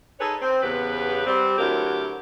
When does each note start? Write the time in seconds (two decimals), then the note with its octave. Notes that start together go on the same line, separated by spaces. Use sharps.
0.20 D#4 G#4 A4 B4 C#5
0.42 C4
0.63 E2 C#3 B3 G4 B4
1.27 G3 C4
1.58 D2 F#3 E4 G4 A#4